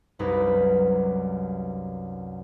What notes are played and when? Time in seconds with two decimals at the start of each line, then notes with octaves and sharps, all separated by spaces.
0.19 C2 F#2 C3 D#4 B4